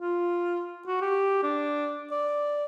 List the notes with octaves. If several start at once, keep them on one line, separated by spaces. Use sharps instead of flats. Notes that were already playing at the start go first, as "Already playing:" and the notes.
F4
F#4
G4
D4
D5